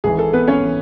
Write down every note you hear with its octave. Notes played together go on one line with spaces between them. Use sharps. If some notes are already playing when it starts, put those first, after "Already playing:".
G#1 G#2 E3 G#4
A4
B3 B4
C#4 C#5
E3